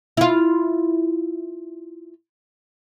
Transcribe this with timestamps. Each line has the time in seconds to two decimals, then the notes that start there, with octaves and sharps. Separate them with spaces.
0.17 E4 F4